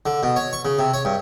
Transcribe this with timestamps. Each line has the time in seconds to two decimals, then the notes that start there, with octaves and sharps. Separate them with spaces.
0.06 D3
0.23 B2
0.36 C#5
0.53 C#6
0.65 C#3
0.79 C3
0.94 C#5
1.05 G2